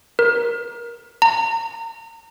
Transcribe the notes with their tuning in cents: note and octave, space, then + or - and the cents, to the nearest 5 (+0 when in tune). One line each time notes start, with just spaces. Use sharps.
A#4 +20
A#5 -35